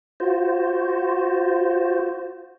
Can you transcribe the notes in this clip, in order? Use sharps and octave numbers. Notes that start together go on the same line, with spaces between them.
F4 F#4 C5